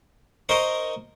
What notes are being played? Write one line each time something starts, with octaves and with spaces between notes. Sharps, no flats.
D#4 A#4 C5 C#6